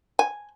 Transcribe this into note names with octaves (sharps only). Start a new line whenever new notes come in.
G#5